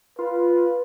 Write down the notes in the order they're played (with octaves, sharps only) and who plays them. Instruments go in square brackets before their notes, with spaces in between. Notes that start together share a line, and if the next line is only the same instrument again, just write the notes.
[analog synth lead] F4 [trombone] B4